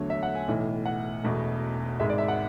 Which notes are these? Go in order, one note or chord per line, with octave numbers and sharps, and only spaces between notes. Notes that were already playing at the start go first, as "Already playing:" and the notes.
Already playing: E2 D3 F#3 A3 C#5
E5
F#5
G#5
B1 A2 E3
F#5
E1 E2 B2 A3
G#1 G#2 G#3 E5
D5
E5
F#5